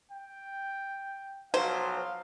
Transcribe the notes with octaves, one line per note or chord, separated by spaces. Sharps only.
G5
B1 F3 F#3 C5 F5